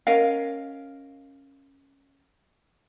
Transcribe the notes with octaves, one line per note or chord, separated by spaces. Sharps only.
C#4 A#4 D#5 F5